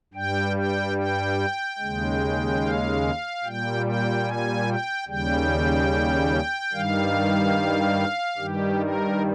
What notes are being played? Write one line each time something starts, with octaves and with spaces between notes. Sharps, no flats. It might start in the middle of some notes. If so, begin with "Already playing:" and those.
G2 G3 G5
G5
G5
D#2 C#3 G#3
F5
A#2 G3 G5
G5
G#5
G5
D#2 C#3 G3 G5
G2 D#3 G3 F5
G2 D#3 G3 G4
A#4